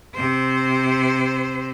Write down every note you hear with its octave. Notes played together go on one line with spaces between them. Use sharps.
C3 C5